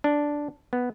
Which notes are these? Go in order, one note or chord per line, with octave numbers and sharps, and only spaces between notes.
D4
B3